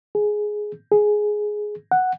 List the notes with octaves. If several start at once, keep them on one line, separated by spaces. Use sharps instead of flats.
G#4
G#4
F#5